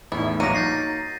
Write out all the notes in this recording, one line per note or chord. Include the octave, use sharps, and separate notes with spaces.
E2 A2 D#4 E4
A#1 G2 F#3 A#3 F#4 D6 A#6 D#7
D#4 G6 A6 C7